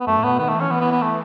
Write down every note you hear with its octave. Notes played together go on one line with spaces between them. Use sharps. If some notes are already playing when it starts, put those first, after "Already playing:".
B3
F#2 A3
A2
B2 B3
D#3 B3
A3
E3
C#4
E3 B3
B3
B3
A3